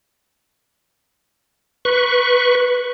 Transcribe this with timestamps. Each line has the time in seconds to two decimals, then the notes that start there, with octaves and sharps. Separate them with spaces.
1.85 B4 C#6